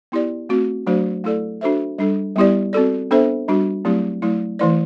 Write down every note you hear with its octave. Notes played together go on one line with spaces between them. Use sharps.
B3 E4 G4 D5
A3 C4 F#4
F#3 A3 D4 F#4 C5
A3 E4 A4 D5
D4 F#4 A4 C5 E5
G3 D4 A4
G3 B3 E4 G4 D5
C4 F#4 A4 D5
B3 D4 A4 C5 E5
G3 D4 F#4
F#3 A3 C4 E4 G4
F#3 A3 E4
E3 A3 E4 B4 D5